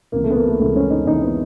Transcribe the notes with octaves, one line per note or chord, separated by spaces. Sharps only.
C#2 C3 E3 A#3
A3
B3
A#3
A3
C#2 C3 E3 A3
C#4
D#4
C#2 C3 E3 D#4
B3